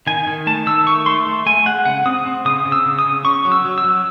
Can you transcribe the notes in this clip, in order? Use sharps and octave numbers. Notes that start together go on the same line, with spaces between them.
D#3 G#5
D#3
A3 A5
D#3 E6
A3 C#6
A3 C6
A3
A3 G#5
G#3 F#5
C#3 F#5
C4 D#6
C4
C#3 D#6
C#3
E6
C#3
D#6
C#3
C#4 C#6
F#3
E6
F#3
E6
F#3